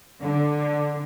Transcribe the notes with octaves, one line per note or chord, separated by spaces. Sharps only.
D3